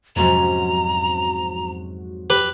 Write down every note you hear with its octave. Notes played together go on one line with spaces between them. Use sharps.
F2 G#2 C3 F#3 C#4 F#4 A#5
G4 B4